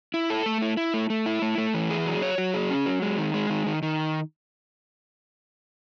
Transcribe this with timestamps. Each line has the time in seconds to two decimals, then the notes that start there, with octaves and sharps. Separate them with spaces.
0.14 E4
0.30 A4
0.46 A3
0.62 E4
0.77 E4
0.94 A3
1.10 A3
1.26 E4
1.42 A3
1.58 A3
1.74 E3
1.90 G#4
2.06 F#3
2.22 C#5
2.38 F#3
2.54 G#4
2.70 C#4
2.86 F#3
3.02 G#3
3.18 D#3
3.34 G#3
3.50 D#3
3.67 D#3
3.83 D#3